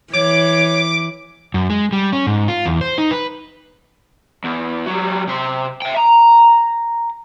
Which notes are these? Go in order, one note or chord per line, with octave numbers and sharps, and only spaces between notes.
E3 C#5 D6
F#2
G#3
G3
C#4
G#2
F4
E2
C5
D#4
B4
E2
F#3 G3
C3 C6
E5 G5
A#5